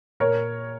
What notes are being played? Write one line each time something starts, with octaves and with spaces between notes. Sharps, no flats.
A#2 A#4 C#5